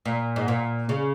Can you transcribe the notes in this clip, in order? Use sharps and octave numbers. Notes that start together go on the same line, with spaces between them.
A#2
G#2
A#2
C#3